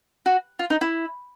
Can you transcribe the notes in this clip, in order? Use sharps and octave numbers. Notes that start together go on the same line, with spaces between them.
F#4
F4
D#4
E4